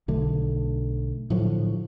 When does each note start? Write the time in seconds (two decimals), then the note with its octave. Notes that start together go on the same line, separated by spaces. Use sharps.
0.08 B1 D3 A3
1.30 A2 D3 F3 F#3